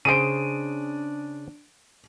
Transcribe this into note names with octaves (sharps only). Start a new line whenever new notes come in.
C#3 D4 G#4 C5 D7 D#7